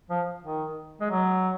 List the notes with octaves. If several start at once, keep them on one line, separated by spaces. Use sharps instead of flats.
F3
D#3
G#3
F#3